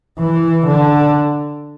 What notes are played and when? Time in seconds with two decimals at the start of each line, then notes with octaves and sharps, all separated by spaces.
0.20 E3
0.67 D3